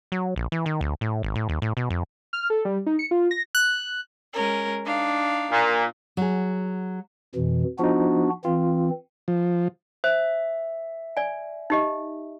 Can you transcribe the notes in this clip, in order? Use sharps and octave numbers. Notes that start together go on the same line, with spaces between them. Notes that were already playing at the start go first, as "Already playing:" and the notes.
F#3
A#1
E3
D#3
D2
A2
G#1
A2
D#2
A2
B2
F2
F6
A4
G3
D#4
C#7
F4
A#6
F#6
G#3 C#4 A#4
D4 D#4 F5
A#2
F#3 G#4
F2 B2 E3
F3 B3 D4 D#4 F#4
E3 C4 F4
F3
C5 E5
D5 G#5
D#4 G4 D#5